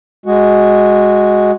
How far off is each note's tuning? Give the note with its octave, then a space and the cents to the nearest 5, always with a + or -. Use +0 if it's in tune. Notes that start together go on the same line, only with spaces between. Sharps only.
G#3 +0 F#4 +0